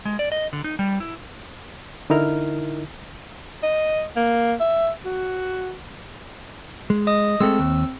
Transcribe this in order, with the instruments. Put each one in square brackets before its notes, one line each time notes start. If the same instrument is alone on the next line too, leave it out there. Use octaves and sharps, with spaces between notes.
[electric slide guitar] G#3
D5
D#5
D3
D#4
G3
E4
[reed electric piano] D3 D#4 E4 A#4 F6
[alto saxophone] D#5
A#3
E5
F#4
[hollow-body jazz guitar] G#3
[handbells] D#5 D#6
[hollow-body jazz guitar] G#3 A3 [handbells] C4 E6
[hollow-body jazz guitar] D#2